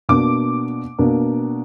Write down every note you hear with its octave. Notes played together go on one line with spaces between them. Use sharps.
B2 A#3 D4 D6
B2 A#3 D4